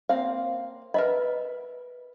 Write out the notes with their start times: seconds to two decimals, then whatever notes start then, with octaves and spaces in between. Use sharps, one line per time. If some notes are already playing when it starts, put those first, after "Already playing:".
0.09 A#3 C4 F5
0.94 A#4 B4 D#5 E5 B5